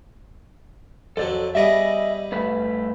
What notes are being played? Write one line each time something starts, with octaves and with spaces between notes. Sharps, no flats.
F2 F#3 A4 D5
G3 B3 G#4 D#5 E5
G2 A3 B4